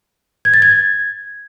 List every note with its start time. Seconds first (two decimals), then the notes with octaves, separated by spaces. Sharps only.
0.45 G#6
0.54 A6
0.62 G#6